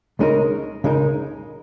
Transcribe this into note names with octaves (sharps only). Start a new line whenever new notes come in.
C#2 C#3 G#3 D#4 A#4
C#2 C#3 G#3 D#4 A#4